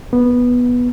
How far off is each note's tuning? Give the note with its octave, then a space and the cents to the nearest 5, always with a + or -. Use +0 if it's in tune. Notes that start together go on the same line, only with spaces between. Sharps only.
B3 -10